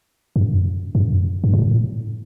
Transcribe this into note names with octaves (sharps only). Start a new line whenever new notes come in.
F#2
F#2
G2
A2